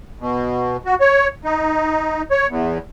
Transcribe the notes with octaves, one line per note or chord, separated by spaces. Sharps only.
B2
F#4
C#5
D#4
C#5
E2